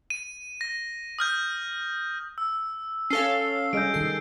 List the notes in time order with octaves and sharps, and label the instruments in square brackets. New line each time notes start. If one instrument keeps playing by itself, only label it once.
[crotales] D#7
A#6
D#6 F6 G6
E6
[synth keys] C#4 A4 F5 [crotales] C7 G7
[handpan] G3 G#4 D#5 [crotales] G6 D7
[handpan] D#3 A4 [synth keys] C7